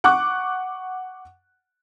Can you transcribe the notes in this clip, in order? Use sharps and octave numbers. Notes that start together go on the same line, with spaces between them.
F#5 C#6 D6 F#6